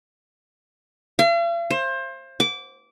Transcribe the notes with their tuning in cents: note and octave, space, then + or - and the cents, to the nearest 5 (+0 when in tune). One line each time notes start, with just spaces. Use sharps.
F5 -45
C5 +25
D6 -20